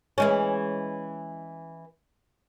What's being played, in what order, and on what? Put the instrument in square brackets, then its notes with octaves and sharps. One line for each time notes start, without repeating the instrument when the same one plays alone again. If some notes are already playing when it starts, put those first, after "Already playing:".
[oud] E3 G#3 C#4